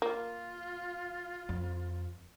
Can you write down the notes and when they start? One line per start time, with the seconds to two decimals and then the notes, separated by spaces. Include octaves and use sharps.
0.02 A#3 F4
1.49 F2